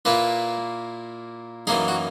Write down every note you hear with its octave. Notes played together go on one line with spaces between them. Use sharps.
A#2 A#3 E4 B4
F#2 E3 A#3 D#4 G#4
F#4